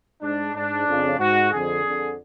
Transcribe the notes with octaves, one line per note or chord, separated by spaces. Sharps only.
G#2 D4
G#2 D4
F2 C#3
G#2 F#4
F2 D3 G#4
F2 D3